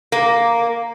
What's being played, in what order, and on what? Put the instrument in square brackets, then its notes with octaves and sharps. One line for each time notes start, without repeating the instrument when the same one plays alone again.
[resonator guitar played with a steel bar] A#3